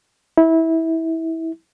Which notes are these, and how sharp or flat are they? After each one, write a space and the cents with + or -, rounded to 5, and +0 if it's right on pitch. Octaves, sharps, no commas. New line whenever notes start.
E4 -20